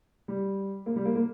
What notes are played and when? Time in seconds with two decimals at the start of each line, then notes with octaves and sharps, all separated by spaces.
0.28 G3
0.86 A#3
0.96 G3
1.05 A#3
1.15 A#3